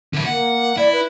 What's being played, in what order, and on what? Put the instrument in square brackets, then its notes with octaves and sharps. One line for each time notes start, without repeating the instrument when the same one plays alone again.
[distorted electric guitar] D3 E4
[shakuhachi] A#3 [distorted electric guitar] F#5
[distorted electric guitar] E4 [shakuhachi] D5
[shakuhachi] B4